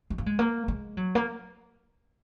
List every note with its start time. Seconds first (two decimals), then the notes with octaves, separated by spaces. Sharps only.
0.10 G#3
0.18 A#3
0.26 G#3
0.39 A#3
0.68 G#3
0.97 F#3
1.15 A#3